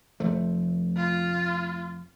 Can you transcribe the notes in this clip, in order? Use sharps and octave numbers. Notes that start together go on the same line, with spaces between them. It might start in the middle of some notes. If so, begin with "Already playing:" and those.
F1 F3 A3
F4